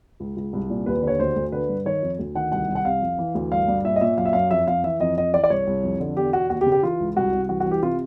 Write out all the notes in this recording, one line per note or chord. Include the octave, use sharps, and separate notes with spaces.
C#2
C#2
C2
A#2
D#2 B4
D3 C#5
D2 C5
D2
D3 B4
G2
D#3 C#5
F2
D2
D#3 F#5
C2 F#5
C2
F#5
C3 F5
F2
E3
D2
G2 F5
G2
A#2 E5
D#5
A#2 E5
F#2 F5
E5
F#2 F5
F2 E5
F2 F5
E3 E5
F2 D#5
F2 D#5
E3 D5
D5
C2 C#5
C2
F2
D3
E2 G4
B2 F#4
D#2 F#4
G4
C#3
G4
E3 F4
C#2
C2 F#4
C2
E3 F#4
F#4
E3
G4
C3 F4